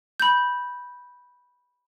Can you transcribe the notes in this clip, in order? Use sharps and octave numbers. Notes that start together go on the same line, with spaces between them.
B5 G6